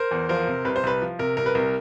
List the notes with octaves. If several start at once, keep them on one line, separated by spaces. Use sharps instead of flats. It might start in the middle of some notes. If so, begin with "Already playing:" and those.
Already playing: A#4 C5
E2
F3 A#4 C5
C3
C2 B4
C5
C2 B4
F3
C3 A#4
C2 A#4
B4
C2 A#4